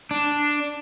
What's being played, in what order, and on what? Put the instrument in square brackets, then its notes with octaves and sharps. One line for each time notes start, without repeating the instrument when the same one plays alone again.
[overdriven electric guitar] D4